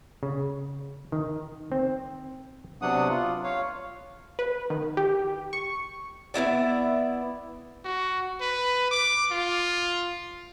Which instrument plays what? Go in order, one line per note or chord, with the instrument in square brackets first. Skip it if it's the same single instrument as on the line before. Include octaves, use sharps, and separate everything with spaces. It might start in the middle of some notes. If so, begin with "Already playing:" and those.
[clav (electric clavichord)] C#3
D#3
C4
[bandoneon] C3 F#3 B3 D4 F#5 D#6
F4
C#5 F5
[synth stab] B4
D#3
G4
C#6
[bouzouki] B3 D#4 E4 D5
[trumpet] F#4
B4
D6
F4